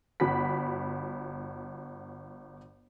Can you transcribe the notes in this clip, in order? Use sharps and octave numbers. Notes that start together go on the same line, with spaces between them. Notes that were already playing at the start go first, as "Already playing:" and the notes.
G1 F#4 B5 B6